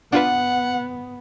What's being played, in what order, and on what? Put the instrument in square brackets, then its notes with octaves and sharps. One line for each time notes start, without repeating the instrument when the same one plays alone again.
[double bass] B3 [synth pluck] D4 F4 B4 [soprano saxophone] F#5